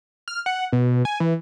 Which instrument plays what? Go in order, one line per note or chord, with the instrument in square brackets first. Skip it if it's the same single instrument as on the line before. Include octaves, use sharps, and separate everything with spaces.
[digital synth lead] F6
F#5
B2
G#5
E3